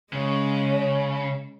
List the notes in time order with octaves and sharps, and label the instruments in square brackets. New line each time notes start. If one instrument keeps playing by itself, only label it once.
[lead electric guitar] C#3 [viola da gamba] G#3 C#4